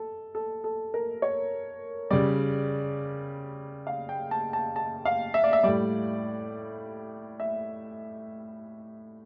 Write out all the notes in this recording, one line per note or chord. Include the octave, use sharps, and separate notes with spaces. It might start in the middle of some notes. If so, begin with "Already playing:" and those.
Already playing: A4
A4
A4
A#4
C#5
C#3 G3 D5
F5
G5
A5
A5
A5
F5
E5
D5
E5
A2 G3 D5
E5